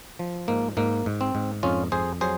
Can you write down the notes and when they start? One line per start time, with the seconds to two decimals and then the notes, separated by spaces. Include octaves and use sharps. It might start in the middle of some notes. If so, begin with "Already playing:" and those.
0.19 F3
0.48 G#2 A#3
0.77 G#2 A#3
1.06 G#2
1.21 C4
1.35 G#2
1.63 F2 C#4 F4
1.92 F2 G#4 C5
2.21 F#3 G#4 C5